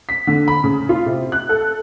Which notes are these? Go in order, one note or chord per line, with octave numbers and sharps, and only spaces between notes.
B6
D3
B5
C#3
F4
C3
F#6
A4